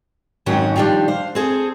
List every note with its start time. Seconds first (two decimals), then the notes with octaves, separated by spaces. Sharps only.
0.46 F2 G#2 D#3 F#3 C#4
0.76 D#3 F3 G3 A3 D4
1.08 C5 F5
1.35 C4 G#4 A4 C5